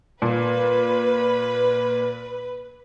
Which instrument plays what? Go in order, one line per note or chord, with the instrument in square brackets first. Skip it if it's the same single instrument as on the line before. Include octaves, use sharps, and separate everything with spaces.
[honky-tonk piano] A#2 [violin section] B4